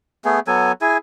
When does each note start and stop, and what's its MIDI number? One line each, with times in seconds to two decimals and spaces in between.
0.25 0.40 57
0.25 0.40 59
0.25 0.40 68
0.47 0.72 54
0.47 0.72 59
0.47 0.72 69
0.47 0.72 80
0.81 0.98 64
0.81 0.98 68
0.81 0.98 80